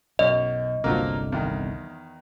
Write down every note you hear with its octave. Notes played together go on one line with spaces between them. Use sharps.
B1 F#2 D#5
G1 C2 D3 F3 F#3 A#3
E2 D#3